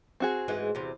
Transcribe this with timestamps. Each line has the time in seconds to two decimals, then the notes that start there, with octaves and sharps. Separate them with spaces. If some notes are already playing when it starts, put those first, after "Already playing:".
0.20 C4 F#4 G#4
0.48 G#2 E3 G#3
0.75 E2 C3